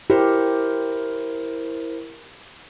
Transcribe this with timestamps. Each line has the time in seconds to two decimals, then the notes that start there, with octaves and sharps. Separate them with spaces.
0.10 E4 G4 A#4 C5